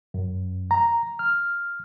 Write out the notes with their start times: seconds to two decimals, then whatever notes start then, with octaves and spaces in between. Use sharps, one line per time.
0.14 F#2
0.71 A#5
1.19 F6